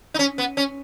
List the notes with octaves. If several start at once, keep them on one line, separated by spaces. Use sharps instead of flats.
D#4
C#4
B3
C#4